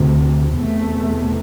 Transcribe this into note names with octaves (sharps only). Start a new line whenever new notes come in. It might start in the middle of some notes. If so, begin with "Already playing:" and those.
Already playing: D2 C3
E2 C3 A3